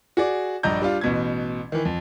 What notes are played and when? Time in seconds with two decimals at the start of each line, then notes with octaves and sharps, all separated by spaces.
0.17 F#4 G#4 D5
0.63 A#1 G2 D#5 A#5 G6
0.82 G3 D4 F4
1.01 A1 B2 G#6
1.72 D#3 E3
1.85 F2